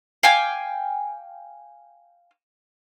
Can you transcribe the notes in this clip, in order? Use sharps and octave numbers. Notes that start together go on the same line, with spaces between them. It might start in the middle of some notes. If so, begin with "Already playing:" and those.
F5 G5 G#5 D6